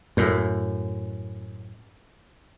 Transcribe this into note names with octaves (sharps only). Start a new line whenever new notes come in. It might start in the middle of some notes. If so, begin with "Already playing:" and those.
F#2 A2